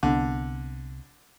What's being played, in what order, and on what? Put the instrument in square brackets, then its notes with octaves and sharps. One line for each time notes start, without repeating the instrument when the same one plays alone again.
[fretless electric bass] C2 B3 [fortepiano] D3